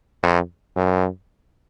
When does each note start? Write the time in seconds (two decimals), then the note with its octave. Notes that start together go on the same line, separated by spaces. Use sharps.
0.23 F2
0.76 F#2